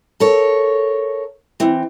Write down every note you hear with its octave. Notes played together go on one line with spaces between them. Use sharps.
A4 A#4 C#5
E3 C4